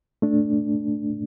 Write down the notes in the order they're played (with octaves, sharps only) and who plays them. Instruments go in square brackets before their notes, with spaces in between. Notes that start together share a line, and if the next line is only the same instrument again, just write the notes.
[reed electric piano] A3 D4